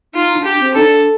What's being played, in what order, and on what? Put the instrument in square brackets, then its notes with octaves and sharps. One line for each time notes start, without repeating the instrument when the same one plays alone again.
[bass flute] D#4 [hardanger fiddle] F4
[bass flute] D4
[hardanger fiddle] G4
[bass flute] C4
[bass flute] D#4 [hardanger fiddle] A4
[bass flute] D4